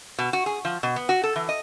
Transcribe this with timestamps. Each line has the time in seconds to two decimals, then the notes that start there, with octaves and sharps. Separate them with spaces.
0.18 B2
0.33 F#4
0.46 G#4
0.65 F3
0.83 B2
0.96 B3
1.09 F#4
1.23 A4
1.36 E3
1.49 D#5